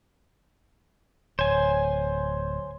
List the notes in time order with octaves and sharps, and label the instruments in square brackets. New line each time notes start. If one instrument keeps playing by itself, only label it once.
[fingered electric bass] D1 [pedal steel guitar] C5 G#5 [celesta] C#5